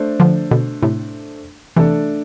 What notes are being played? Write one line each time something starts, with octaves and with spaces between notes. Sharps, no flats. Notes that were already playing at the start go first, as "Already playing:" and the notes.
Already playing: A3 D4 A4 C5
D3 F3
B2 D3
A2 C3
C3 E3 A3 D4 A4